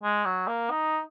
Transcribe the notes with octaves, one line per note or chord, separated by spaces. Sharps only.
G#3
F#3
A#3
D#4